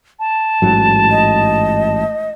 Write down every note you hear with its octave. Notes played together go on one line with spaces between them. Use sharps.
A5
A1 G#2 F#3
D#5